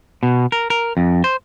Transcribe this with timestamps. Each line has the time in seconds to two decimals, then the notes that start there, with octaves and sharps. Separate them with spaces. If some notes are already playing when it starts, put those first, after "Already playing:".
0.23 B2
0.52 A#4
0.70 A#4
0.97 F2
1.24 C5